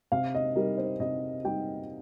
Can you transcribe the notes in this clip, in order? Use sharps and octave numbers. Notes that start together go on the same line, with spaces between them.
C3 F5
D#5
G3 D#4 A#4
C5
C3 D#5
G3 D#4 G5